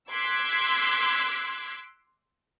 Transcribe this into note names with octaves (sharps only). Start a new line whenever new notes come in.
C6 D6 E6 F#6 G#6 B6